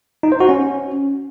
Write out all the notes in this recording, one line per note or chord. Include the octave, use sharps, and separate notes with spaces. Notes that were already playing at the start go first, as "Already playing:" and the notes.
D#4
C5
F#4
C#4